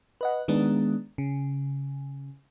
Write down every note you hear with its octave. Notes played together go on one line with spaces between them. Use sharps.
B4 D#5 F#5
D#3 G#3 B3 D4
C#3